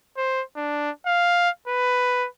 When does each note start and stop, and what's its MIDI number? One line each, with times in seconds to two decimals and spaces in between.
0.17 0.42 72
0.57 0.90 62
1.06 1.50 77
1.68 2.27 71